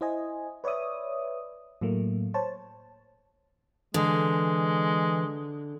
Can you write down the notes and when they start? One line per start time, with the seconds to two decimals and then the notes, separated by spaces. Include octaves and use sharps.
0.01 E4 C5 D#5 G#5
0.64 B4 C#5 D5 E5 D#6
1.81 A2 F#3 A3 A#3
2.34 C5 C#5 A5
3.94 D3 E3 G#3